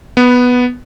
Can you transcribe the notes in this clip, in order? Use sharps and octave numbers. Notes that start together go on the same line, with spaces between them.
B3